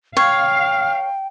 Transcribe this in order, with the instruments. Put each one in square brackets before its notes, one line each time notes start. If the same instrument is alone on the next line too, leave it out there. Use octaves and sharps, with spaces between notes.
[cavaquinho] C#5 [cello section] F5 [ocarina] G5 [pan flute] F6